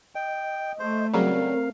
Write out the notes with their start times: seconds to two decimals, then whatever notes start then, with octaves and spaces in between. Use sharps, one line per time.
0.15 D#5 G5
0.79 A3 C5
1.13 C#3 F#3 G3 C4 A#4 F5